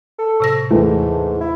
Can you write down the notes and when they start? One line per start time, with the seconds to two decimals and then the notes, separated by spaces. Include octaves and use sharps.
0.19 A4
0.40 A2 C3 A#6
0.71 D#2 G#2 E3 A3
1.41 E4